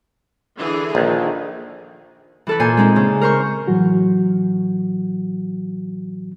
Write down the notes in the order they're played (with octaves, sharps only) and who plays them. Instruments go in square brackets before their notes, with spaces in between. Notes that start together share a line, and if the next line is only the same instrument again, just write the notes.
[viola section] D3 E3 G#4
[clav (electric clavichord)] A#1 [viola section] D#3
[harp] E3 A4 B4
A#2 C5 G#5
G#3 C4 D#4
C#3
A#4 C5 C#6
[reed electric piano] A2 E3 F#3 F#4